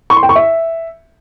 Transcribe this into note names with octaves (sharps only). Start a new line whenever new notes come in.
C#6
C6
G5
C#6
E5